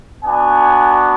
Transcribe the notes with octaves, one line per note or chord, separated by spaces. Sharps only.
B3 D4 F#4 G#5